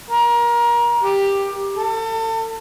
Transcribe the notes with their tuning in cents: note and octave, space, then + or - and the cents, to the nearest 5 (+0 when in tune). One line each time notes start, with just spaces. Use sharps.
A#4 +25
G4 +10
A4 +35